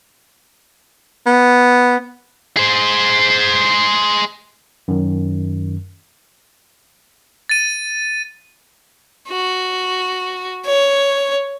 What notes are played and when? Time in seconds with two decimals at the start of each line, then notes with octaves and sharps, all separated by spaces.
1.26 B3
2.57 G#4 C5
4.88 F#2 D#3
7.49 A6 D#7
9.29 F#4
10.66 C#5